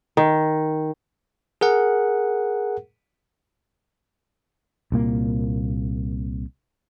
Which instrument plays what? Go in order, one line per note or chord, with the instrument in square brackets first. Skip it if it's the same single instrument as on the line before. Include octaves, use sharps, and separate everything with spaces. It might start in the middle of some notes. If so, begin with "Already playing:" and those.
[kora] D#3
[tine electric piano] G#4 A#4 F#5
[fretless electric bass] C2 A#2 A#3